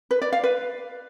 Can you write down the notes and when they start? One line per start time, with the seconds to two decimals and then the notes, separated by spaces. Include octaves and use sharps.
0.11 B4
0.22 D5
0.33 F5
0.43 B4